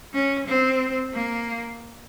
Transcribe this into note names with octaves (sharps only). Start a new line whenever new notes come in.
C#4
C4
A#3